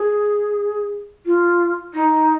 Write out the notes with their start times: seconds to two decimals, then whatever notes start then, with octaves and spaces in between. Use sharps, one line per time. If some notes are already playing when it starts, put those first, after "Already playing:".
Already playing: G#4
1.25 F4
1.93 D#4